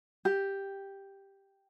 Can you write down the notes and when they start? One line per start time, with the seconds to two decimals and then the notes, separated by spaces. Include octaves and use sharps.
0.25 G4